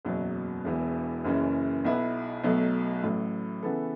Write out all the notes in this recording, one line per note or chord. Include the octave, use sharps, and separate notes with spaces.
F#1 E2 B2 F#3
E1 E2 E3
F#1 F#2 C#3 E3 C#4
B1 B2 B3 E4 B4
B1 B2 F#3 A3
A1 A2 F#3
C#3 E3 B3 A4